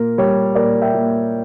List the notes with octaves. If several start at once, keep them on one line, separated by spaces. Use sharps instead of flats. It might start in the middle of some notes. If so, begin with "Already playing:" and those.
Already playing: A#2 A#4
G3 C#5
A#2 A#4 D5
E5 G5
A#2